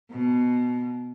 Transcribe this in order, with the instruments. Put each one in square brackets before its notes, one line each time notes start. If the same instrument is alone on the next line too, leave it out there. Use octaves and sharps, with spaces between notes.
[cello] B2